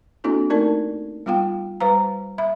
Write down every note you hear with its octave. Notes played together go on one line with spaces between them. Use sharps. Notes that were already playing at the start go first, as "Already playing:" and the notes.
A#3 C4 D4 E4 F#4 A4
A3 D#4 A#4 D5 A5
G3 B3 F4 F5 G5
G3 B4 C5 F5 A#5
E5 B5